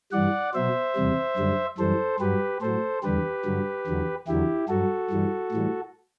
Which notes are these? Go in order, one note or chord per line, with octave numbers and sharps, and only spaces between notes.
G2 E3 G3 D5 F#5
B2 F#3 C5 E5
E2 C3 G3
F#2 D3 G3
F#2 E3 G3 A4 C5
G2 F#3 G4 B4
A2 F#3 A4 C5
E2 D3 G3 G4 B4
G2 D3 F#3
E2 D3 F#3
E2 D3 F#3 E4 G4
G2 F#3 F#4 A4
G2 E3 G3
A2 E3 G3